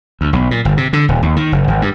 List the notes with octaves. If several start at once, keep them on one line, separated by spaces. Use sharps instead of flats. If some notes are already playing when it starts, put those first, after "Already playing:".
D2
B1
A#2
G1
C3
D3
D#1
D#2
D#3
F#1
G#1
G2